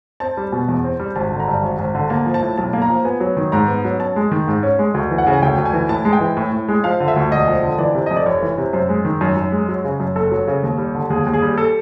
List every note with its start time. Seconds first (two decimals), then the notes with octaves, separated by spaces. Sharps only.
0.20 C4 A5
0.37 G3
0.52 B2
0.68 E2
0.84 C4
1.00 G3
1.16 G#1 A5
1.32 D3
1.40 A#5
1.48 G2
1.63 G#1
1.79 G#1
1.95 D3
2.10 A#3 A5
2.26 F3
2.34 A5
2.42 A2
2.58 B1 A5
2.73 A#3
2.82 A#5
2.90 F3
3.05 B3 G#5
3.20 F#3
3.37 D#3
3.52 G#2 A#5
3.68 B3
3.84 F#3
4.00 C#4 A5
4.16 G#3
4.31 D#3
4.48 G#2
4.63 C#4
4.79 G#3
4.94 D2
5.11 E3
5.18 F#5
5.27 C#3
5.33 G#5
5.42 D2 G5
5.58 D2
5.66 G#5
5.73 E3
5.89 A2 A5
6.05 G#3
6.13 G5
6.21 E3
6.37 A2
6.52 A2
6.68 G#3
6.84 F3 F5
7.00 D3
7.08 E5
7.16 D2
7.32 E1 D#5
7.47 F3
7.63 D3
7.78 E3 D5
7.95 C3
8.06 F2 D#5
8.17 D5
8.26 F1 C#5
8.42 E3
8.58 C3
8.73 F#2 C5
8.89 G#3
9.05 D#3
9.21 F#2
9.37 F#2
9.52 G#3
9.68 F#3
9.85 C#3
10.00 F#2
10.16 F#1 A4
10.31 F#3
10.48 C#3
10.63 D#2
10.78 G3
10.94 D3
11.10 D#2 G#4
11.26 D#2
11.34 G#4
11.42 G3
11.58 A4